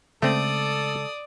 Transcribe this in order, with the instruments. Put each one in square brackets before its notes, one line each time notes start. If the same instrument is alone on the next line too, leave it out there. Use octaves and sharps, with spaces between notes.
[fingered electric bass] C#3 G#3 [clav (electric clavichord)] A3 C4 [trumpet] A4 [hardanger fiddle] D5 D#6